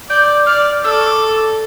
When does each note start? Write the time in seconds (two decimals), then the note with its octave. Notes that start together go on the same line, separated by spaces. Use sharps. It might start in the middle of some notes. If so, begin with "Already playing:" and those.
0.09 D5 G6
0.46 D5 F6
0.84 A4 E6
0.91 D6
1.00 C#6
1.07 D6